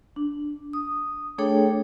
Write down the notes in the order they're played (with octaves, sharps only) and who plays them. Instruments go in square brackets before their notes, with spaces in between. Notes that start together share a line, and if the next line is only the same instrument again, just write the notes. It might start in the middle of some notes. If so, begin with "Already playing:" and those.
[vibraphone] D4
D#6
A3 D4 G#4 A4 C#5 G5